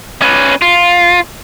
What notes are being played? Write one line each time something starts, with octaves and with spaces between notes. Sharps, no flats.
C#4 B4
F4